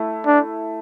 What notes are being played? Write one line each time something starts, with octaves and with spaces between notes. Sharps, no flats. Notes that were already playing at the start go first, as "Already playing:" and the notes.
Already playing: A3 E4
D4